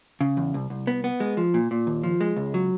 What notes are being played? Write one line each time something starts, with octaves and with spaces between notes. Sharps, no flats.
C#3
E2
C2
C2
B3
B3
G#3
F3
A#2
A#2
D#2
F3
G#3
C#2
F#3